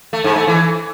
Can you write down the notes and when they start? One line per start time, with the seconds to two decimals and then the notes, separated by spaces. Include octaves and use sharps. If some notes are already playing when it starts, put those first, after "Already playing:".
0.13 A3
0.24 G#2
0.36 A3
0.47 E3